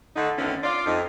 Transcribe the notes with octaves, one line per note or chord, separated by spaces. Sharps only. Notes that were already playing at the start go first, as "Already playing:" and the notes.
D3 A3 D#4
F2 D3 D#3 A3 B3 C#4
F4 D5
F2 D#4